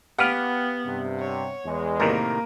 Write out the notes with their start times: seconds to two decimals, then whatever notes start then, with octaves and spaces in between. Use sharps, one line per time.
0.19 B3 G4 B4 F5 F#5 F6
0.85 G2 C3
1.19 C#5
1.65 E2 G#3
2.00 A2 C3 D#3 A#3 A#4